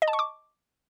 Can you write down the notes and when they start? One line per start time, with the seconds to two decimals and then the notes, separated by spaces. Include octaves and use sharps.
0.02 D#5
0.08 A5
0.13 C#6
0.19 D6